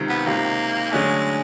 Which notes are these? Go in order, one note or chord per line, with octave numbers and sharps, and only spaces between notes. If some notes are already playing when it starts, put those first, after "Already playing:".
Already playing: C#2 C3 D#3
B3
C#2 C3 D#3 A#3
D3 F#3 G#3 A3 C#4